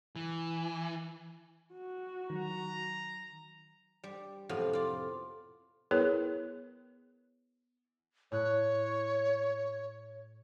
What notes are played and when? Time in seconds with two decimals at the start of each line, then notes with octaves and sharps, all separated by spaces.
0.16 E3
1.74 F#4
2.30 D#3 F#3 A#5
4.04 G3
4.49 F2 A2 C3 B3 F5
4.73 F4 D5
5.91 B3 E4 G#4 A#4 B4 C#5
8.32 A2 C#5 F#6